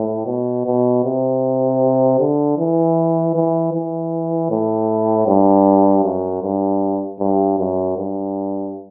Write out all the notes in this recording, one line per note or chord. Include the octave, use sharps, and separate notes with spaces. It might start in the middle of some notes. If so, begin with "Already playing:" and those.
Already playing: A2
B2
B2
C3
D3
E3
E3
E3
A2
G2
F#2
G2
G2
F#2
G2